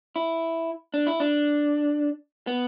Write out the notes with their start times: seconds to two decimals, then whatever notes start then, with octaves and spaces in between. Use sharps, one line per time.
0.16 E4
0.94 D4
1.07 E4
1.20 D4
2.47 B3